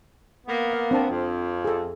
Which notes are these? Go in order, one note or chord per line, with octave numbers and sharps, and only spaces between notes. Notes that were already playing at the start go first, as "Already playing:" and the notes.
A#3 B3
F5
C4 D4 A5
F2
G#4 A4